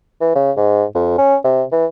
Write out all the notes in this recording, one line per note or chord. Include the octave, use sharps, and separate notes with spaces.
E3
C#3
G#2
F2
C#4
C3
E3